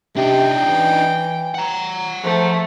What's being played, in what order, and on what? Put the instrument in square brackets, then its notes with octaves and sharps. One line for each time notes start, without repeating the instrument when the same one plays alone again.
[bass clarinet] C3 [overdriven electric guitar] D4 D#4 [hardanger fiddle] G5
[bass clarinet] E3
[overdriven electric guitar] F#5 A#5
[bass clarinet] F3 [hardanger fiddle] A3